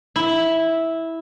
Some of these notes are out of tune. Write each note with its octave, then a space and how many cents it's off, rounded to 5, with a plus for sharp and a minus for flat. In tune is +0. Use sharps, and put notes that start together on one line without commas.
E4 -10